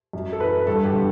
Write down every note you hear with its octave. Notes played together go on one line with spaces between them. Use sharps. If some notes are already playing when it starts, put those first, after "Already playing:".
F#2
A4
E3 B4
G2 A4
G4
D3